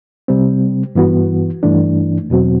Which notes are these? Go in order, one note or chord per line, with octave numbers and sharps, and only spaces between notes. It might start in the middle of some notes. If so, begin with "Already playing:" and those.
C3 G3 C4
G2 E3 B3 F#4
G2 E3 A3 D4
E2 B2 F#3 C4 F#4